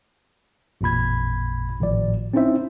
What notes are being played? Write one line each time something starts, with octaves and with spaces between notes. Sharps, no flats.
A1 F2 A#2 B5 G#6
G#1 A2 F3 D5
C4 C#4 D#4 E4 C5 E5